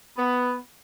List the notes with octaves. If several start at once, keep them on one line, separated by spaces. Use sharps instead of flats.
B3